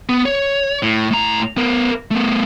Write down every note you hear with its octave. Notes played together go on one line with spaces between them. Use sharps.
B3
C#5
A2
A2 A#5
B3 A#4
A3 B3